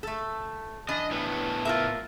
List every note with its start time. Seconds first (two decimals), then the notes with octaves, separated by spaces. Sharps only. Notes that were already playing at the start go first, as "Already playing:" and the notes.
0.03 A3 A4
0.89 E3 D4 D#5
1.11 A2 A3 B3
1.65 F4 A#4 E5